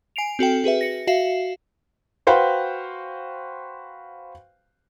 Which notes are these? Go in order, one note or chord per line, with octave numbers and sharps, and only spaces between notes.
G#5 C7 D7 F7
C4 F#4 A4 G5
F#4 G#4 B4 E5
A#6 C#7
F#4 E5 F5 C7 E7
F#4 B4 C5 F5 G5